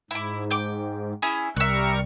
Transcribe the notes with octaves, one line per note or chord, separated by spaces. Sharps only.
G#2 E4 D6
G5 D6
C#4 E4 G#4
C2 G3 A#4 E5 C#6 F#6